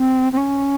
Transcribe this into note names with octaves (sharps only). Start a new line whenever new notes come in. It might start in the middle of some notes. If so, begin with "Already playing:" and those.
Already playing: C4
C4
C#4